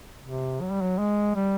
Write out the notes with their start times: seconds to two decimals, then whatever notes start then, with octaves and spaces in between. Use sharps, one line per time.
0.24 C3
0.61 F#3
0.71 G3
0.81 F#3
0.99 G#3
1.36 G3